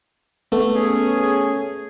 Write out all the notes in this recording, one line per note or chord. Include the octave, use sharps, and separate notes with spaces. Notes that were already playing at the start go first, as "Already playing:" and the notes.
A3 B3
C#4 G#4